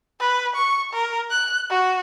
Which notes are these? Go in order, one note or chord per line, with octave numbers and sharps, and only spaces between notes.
B4
C#6
A#4
F#6
F#4